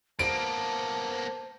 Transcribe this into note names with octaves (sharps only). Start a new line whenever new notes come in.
A#3 B3 C5 A5 D7